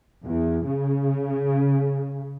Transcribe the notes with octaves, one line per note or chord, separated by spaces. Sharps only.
E2
C#3